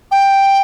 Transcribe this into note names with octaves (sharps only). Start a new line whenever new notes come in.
G5